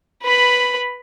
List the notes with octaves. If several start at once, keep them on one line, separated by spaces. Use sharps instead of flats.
B4 B5